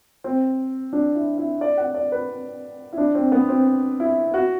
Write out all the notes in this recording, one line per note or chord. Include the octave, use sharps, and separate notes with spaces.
C4
D4
E4
E4
D5
F#5
D5
B4
E4
D4
C4
B3
C4
E4
F#4